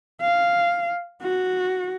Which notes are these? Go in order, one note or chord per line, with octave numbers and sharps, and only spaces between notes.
F5
F#4